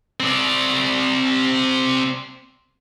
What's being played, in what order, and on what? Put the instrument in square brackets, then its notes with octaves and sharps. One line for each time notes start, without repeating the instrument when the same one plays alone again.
[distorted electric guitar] C4 D5